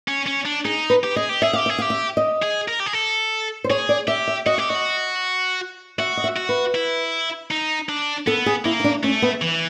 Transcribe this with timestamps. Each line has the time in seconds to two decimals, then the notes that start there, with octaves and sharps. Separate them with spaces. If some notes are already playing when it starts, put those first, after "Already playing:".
0.08 C#4
0.26 C#4
0.46 D4
0.65 D#4 G#4
0.90 B4
1.04 G4
1.16 G#4 D#5
1.29 G4
1.42 G#4 E5
1.53 G4 F5
1.66 G#4 E5
1.78 G4 F5
1.90 E5
2.17 D#5
2.42 G#4
2.68 A#4
2.80 G4
2.86 G#4
2.93 A4
3.64 C5
3.70 G#4 C#5
3.89 D5
4.08 G4 E5
4.28 E5
4.46 F#4 D#5
4.58 G4 E5
4.69 F#4 D#5
5.98 F#4 E5
6.17 D#5
6.24 E5
6.36 F#4
6.49 B4
6.75 E4
7.51 D#4
7.89 D4
8.27 B3 A4
8.46 G#4
8.65 A#3 E4
8.80 D#4
8.84 D4
9.03 A3 C#4
9.22 B3
9.42 E3